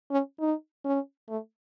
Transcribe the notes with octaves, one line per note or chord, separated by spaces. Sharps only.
C#4
D#4
C#4
A3